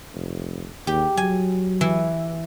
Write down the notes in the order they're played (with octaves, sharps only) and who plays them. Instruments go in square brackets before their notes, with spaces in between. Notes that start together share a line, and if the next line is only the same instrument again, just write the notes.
[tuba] F1
[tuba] D#2 [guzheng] G4
[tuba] F#3 [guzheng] G#5
[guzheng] E3